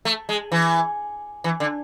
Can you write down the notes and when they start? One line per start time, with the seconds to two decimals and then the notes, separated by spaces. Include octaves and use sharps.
0.05 A3
0.29 G#3
0.52 E3
1.44 E3
1.60 D3